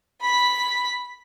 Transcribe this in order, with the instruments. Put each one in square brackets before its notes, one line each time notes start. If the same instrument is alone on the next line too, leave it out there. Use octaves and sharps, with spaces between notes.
[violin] B5 B6